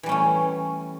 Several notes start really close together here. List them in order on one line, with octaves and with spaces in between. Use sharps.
E3 G3 C#4 A3